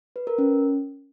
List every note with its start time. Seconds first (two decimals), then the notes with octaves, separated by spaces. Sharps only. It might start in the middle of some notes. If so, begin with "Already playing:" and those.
0.16 B4
0.27 A#4
0.38 C#4